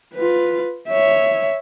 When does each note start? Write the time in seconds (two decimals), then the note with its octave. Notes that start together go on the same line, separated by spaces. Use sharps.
0.14 F4 B4
0.88 C#5 E5